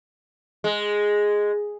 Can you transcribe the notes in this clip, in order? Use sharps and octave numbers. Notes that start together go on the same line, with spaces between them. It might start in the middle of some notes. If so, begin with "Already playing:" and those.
G#3